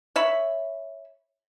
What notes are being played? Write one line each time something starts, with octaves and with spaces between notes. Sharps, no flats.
C#5 E5 B5